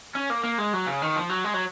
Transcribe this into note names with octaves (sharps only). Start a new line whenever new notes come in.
C#4
A#3
A#3
G#3
F#3
C#3
D#3
F3
F#3
G#3
F#3